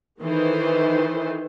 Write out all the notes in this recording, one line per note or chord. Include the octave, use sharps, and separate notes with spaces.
D#3 E3 A4 C5